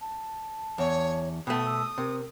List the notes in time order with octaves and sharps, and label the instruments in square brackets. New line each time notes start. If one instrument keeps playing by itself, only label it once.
[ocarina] A5
[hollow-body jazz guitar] E2 [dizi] C#5
[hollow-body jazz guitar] B2 A3 [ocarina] G5 [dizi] D#6
[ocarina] E6
[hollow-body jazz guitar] C3 [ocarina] A#4